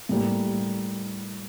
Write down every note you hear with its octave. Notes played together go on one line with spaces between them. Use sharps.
A2 G3 A#3